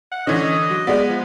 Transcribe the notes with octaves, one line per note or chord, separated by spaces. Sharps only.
F#5
D3 E3 C#4 D#5
F#3
G#3 B3 D5
F3